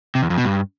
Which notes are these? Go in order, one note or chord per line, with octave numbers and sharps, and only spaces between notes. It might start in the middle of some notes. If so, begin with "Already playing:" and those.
C3
E2
F2
B2
G2